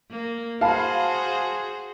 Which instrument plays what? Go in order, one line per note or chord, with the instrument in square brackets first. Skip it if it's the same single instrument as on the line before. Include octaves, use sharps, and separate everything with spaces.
[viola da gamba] A#3
[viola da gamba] F#4 G#4 C5 [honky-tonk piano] F5 A5 B5